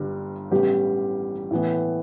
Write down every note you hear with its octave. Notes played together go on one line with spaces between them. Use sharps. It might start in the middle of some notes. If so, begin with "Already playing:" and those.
Already playing: G1 G2 G3
A1 A2 G3 B3 G4
A2 E3 B3